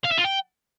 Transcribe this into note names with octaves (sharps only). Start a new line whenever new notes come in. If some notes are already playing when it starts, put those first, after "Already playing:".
F5
E5
F4
G5